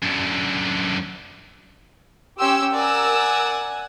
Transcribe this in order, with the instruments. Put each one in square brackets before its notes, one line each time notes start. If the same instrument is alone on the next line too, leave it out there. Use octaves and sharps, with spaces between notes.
[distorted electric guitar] F#2 D3
[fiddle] C#4 C6 [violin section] G4 G5 E6
[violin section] A#4 E6 [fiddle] D5 [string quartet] F#5 G#5